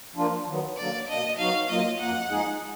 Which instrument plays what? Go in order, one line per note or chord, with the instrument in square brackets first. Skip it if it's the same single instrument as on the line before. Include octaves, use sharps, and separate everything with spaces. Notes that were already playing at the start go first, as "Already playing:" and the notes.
[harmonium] F3 A#3 D4 F4
D#3 F#3 B3
[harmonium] D3 F#3 A#3 [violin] D5
[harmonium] B2 A#3 D4 [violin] D#5
[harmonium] F#3 B3 D#4 F#4 [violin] F5
[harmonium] F#3 A#3 F4 [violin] D#5
[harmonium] F#2 F3 A#3 [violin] F#5
[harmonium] F3 G#3 D#4 G#4